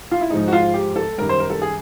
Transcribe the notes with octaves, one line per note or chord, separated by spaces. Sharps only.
F4
E4
G#2 F3 G#3 D#4
F#4
F4
G4
A4
F#2 D#3 G3 A#4
C5
A#4
A4
G#4